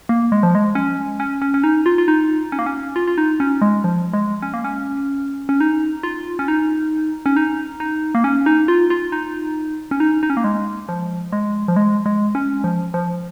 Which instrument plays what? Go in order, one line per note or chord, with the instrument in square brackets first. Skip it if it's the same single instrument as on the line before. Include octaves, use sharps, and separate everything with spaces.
[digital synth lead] A#3
G#3
F3
G#3
C#4
C#4
C#4
C#4
D#4
F4
F4
D#4
C#4
A#3
C#4
F4
F4
D#4
C#4
G#3
F3
G#3
C#4
A#3
C#4
C#4
D#4
F4
C#4
D#4
C#4
D#4
D#4
A#3
C#4
D#4
F4
F4
D#4
C#4
D#4
D#4
C#4
A#3
G#3
F3
G#3
F3
G#3
G#3
C#4
F3
F3